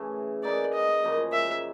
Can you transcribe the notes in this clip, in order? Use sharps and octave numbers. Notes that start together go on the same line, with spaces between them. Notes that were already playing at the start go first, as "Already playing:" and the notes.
Already playing: C#3 E3 A3
A#3 D#4 G#4 B4 D5
D#5
F#2 C#3 F3 A#3
E5